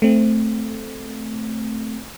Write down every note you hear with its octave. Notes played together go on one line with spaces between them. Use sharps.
A3 C4